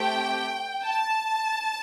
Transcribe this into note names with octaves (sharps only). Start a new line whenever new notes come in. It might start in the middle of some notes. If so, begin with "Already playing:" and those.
Already playing: A3 C4 G4 G5
A5